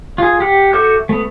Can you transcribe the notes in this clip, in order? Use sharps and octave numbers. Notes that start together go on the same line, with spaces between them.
F4 G#4
G4 F#5
F#4 A4 E5 D6 G6
A3 B3